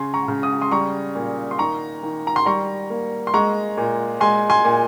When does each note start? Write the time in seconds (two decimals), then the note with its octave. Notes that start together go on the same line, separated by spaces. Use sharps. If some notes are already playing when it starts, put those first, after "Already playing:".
Already playing: C#3 G#5 C6
0.14 A#5 C#6
0.28 C#3
0.43 D#6
0.61 C6 D#6
0.71 G3 A#5 C#6
1.15 A#2
1.51 C6
1.58 D#3 A#5 C#6
2.03 D#3
2.27 A#5
2.36 C6
2.46 G3 A#5 C#6
2.90 A#3
3.27 C6
3.34 G#3 A#5 C#6
3.77 A#2
4.20 G#3 G#5 C6
4.50 G#5 C6
4.65 A#2